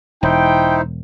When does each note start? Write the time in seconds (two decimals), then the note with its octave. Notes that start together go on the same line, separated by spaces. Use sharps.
0.23 E1 D#4 E4 C5 G5